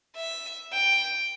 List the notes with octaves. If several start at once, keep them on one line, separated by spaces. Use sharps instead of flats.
E5
G5